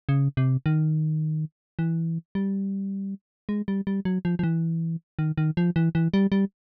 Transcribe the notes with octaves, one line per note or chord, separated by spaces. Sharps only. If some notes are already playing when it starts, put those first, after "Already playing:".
C#3
C3
D#3
E3
G3
G#3
G3
G3
F#3
F3
F3
E3
D#3
D#3
F3
E3
E3
G3
G3